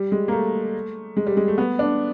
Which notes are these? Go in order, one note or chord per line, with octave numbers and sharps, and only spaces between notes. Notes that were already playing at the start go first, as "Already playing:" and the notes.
Already playing: G3
G#3
A#3
A3
G#3
G3
G#3
A3
B3
D4